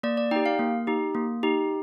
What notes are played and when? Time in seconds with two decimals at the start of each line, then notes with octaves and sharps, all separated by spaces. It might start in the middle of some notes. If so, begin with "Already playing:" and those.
0.03 A#3 D5
0.17 D5
0.31 D#4 G4 G5
0.46 F5
0.59 A#3
0.87 D#4 G4
1.15 A#3
1.43 D#4 G4